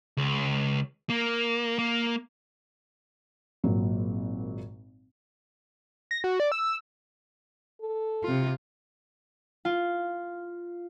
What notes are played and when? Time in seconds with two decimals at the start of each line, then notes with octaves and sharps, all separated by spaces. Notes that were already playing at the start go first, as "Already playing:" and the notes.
0.17 C#2
1.10 A#3
1.79 A#3
3.64 G#1 A#2 F#3
6.11 A#6
6.24 F#4
6.40 D5
6.52 E6
7.81 A4
8.24 C3 F4
9.65 F4